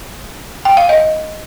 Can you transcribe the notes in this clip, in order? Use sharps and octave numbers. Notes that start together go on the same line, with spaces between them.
G5
F5
D#5